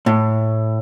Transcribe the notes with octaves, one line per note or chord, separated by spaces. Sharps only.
A2